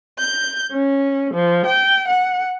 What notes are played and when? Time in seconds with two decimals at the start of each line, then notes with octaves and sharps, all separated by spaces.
0.19 G6
0.71 C#4
1.33 F3
1.67 G5
2.08 F#5